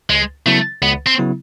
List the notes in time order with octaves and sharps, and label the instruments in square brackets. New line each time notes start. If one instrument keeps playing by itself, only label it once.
[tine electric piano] C#2 [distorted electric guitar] G#3
[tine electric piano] C#3 F#3 B3 E4 [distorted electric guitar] A3
[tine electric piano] C#2 [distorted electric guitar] B3
[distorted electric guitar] C4
[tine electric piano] C#3 F#3 B3 E4